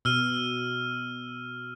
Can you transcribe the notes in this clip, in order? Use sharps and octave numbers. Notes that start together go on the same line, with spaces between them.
B2 E6 F6 D#7